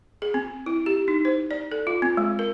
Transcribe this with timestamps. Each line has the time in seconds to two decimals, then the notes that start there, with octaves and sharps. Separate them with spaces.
0.22 G#4
0.34 C4
0.66 E4
0.86 G4
1.08 D#4
1.25 C5
1.51 D5
1.72 A4
1.87 F4
2.02 C4
2.17 G#3
2.39 A#4